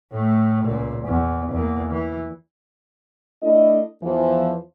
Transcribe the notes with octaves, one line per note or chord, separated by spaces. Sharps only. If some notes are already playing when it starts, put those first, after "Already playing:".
A2 A3
C#2 A#2
E2
E2 A#3
E3
A3 D4 E4 D#5
E2 E3 F3